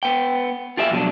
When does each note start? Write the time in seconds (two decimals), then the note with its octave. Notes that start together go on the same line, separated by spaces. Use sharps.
0.03 B3 G5
0.77 F4 G4 G#4 E5
0.90 F2 B2 F#3 D4